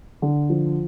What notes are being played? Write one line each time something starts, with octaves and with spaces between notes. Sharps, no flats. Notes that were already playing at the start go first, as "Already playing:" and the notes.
D3
F3